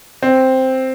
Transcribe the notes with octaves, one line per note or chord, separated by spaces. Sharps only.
C4